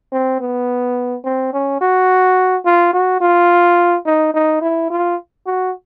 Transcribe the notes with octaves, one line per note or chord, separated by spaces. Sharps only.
C4
B3
C4
C#4
F#4
F4
F#4
F4
D#4
D#4
E4
F4
F#4